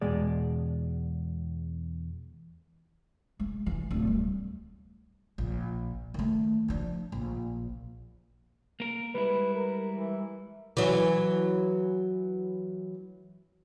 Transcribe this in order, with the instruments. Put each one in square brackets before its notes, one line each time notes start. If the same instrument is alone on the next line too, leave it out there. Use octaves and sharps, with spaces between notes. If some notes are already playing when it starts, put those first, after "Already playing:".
[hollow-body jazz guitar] E2 B2 G#3 D5
[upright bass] G#3
E3
D1
G3
A#1
D#3 A3
F3 D4
A#1
[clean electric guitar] A#3 A#4
[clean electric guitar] G3 G#3 E4 [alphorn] B4
[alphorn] A#4
E3
[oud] E3 F#3